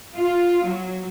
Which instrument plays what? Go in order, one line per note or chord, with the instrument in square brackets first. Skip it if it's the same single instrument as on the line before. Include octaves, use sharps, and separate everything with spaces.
[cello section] F4
F#3